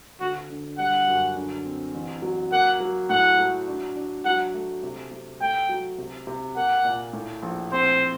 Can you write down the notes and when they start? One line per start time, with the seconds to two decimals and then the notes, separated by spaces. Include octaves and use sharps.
0.20 D2 F#4
0.50 D3
0.78 G3 F#5
1.08 F#2
1.36 D3
1.65 C4
1.94 A1
2.22 F#3
2.52 A#3 F#5
2.80 F#3
3.09 A2 F#5
3.39 F#3
3.68 D4
3.96 D4
4.25 F#3 F#5
4.54 A3
4.83 C3
5.11 C3
5.41 A3 G5
5.69 F#3
5.98 C3
6.27 C3
6.56 A#3 F#5
6.85 A#2
7.13 A2
7.43 A#1
7.72 C4 C5